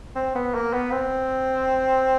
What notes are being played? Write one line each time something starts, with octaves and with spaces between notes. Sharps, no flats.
C4
B3
A#3
B3
C4